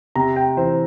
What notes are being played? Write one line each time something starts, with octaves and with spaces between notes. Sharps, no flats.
C3 A#5
G5
E3 C5